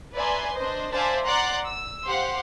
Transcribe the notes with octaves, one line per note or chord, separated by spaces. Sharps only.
B4 D5 E5 G#5 A#5 C6
D4 C5 D#5
C5 D5 E5 F5 G#5 A5
D5 F#5 A#5 C6 F#6
E6
G4 C5 F5 F#5 C6